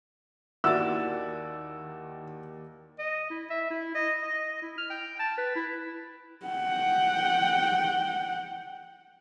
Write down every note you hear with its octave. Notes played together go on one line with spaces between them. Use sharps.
D#2 D#3 E4 F#4 D5 E6 A6
D#5
E4
E5
E4
D#5
D#5
E4
F6
G5
A5
B4
E4
F#5 G5